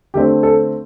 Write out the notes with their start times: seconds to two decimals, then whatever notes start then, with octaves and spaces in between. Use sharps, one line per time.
0.14 D3 A3 C4 G4
0.43 A4